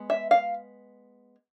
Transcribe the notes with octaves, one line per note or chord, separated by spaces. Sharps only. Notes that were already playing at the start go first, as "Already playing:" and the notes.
Already playing: G#3 B3
E5
F5